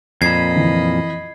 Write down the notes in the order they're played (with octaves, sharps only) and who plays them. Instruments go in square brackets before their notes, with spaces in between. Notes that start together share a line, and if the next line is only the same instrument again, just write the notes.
[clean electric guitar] F2 A#2 [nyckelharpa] D#5 B5 [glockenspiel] G#6 C7
[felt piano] E3